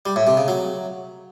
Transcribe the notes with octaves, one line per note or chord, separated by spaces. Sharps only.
G3
A2
C3
C#3
F#3